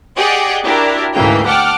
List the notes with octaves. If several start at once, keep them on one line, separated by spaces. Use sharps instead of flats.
G4 G#4 D5 D#5 F#5 G5
D4 E4 F#4 G4 A#4
D2 G#2 C#3 E3 A#3 G5
F#5 G5 A5 D6 F6